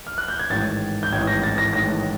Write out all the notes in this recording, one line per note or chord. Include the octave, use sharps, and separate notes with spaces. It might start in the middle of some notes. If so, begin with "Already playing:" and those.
F6
F#6
G6
G#6
A1 G#2 D#3 A6
G6
A1 G#2 D#3 G#6
A#6
A6
A#6
A1 G#2 D#3 A#6